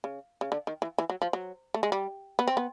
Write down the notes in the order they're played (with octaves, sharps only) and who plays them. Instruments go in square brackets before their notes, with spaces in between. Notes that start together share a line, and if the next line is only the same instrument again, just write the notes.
[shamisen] C#3
C#3
D3
D#3
E3
E3
F#3
F3
F#3
A3
G#3
G3
B3
C4
B3